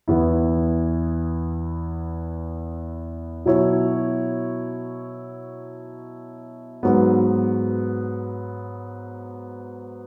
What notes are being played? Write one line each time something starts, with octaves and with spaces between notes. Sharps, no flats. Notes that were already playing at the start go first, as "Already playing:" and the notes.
E2 E3 B3 E4
B2 F#3 E4 C#5
G#2 F#3 B3